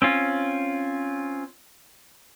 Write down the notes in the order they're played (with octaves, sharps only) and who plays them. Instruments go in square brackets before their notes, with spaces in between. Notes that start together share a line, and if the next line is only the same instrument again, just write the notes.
[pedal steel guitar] C4 C#4 F4